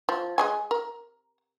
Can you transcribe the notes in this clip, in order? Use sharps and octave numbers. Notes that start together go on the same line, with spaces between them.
F3
G#3 D#5 G#5
A#4